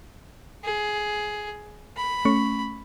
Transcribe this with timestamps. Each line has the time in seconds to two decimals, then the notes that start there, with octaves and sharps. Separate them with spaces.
0.64 G#4
1.96 B5
2.25 A3 C#4 C#6